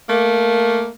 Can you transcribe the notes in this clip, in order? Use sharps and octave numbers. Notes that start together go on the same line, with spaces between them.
A3 A#3